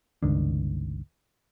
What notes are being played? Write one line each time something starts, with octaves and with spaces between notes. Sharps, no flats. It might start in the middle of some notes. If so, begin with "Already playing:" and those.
G1 C#2 D#3 D4